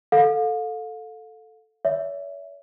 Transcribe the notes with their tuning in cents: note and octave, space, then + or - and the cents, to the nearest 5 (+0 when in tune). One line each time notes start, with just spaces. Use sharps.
A4 +0 F5 +35
C#5 +40 E5 +0